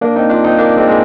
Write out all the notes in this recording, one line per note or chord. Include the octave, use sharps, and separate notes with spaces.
A#3 D4
C4 D#4
D4 F4
C4 D#4
A#3 D4
G#3 C4
G#3